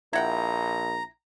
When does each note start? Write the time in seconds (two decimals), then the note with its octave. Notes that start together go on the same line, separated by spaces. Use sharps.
0.13 A#1 E4 F#5 G5 A#5